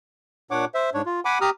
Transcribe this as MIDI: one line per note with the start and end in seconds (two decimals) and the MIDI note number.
0.51 0.65 46
0.51 0.65 62
0.51 0.65 73
0.51 0.65 78
0.51 0.65 86
0.74 0.90 72
0.74 0.90 76
0.94 1.02 44
0.94 1.02 62
0.94 1.02 73
1.06 1.20 65
1.25 1.38 78
1.25 1.38 80
1.25 1.38 83
1.25 1.38 86
1.41 1.50 67
1.41 1.50 82
1.41 1.50 87
1.41 1.50 89